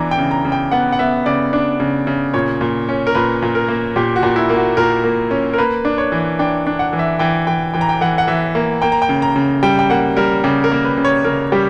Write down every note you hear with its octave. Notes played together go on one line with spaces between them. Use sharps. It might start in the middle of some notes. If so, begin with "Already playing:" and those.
Already playing: E3 B3 D4 A#5
G5
C#3
A#5
C#3
G5
B3 F#5
F#5
B3 E5
C#3 D5
D4
C#3
C#3
A#2 C#5
A#2
C#4
A#4
A#2 B4
A#2
A#4
A#3
A#2 G4
F#4
A#2
E4
A#3
F#4
A#2 A#4
A#3
C#4
A#4
A#3 B4
D4
C#5
E3
D4 G5
D4
F#5
E3
E5
E3 G5
E3 G5
E3 G5
A#5
G5
E3 F#5
F#5
E3 E5
A#3
A#3 G5
A#5
G5
C#3
A#5
C#3
G3 G5
G5
A#3 F#5
G3 A#4
C#3 G4
A#4
A#3
B4
C#3
C#5
C#3 A#4
G3 G4